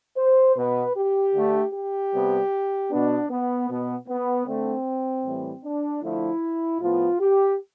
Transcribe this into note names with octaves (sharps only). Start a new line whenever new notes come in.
C5
B2 B3 B4
G4
D3 A3
G4
C3 G3 B3
B2 B3 D4
B3
B2 B3
B3
D3 A3 C4
A2 E3 G3
D4
D3 F3 A3 E4
A2 F3 B3 F4
G4